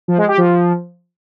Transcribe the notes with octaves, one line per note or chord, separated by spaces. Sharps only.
F3
G#3
G4
F3